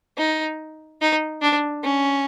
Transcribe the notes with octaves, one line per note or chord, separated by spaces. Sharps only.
D#4
D#4
D4
C#4